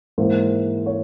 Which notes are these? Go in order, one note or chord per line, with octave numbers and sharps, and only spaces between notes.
G#2 E3 A#3 C5
C#5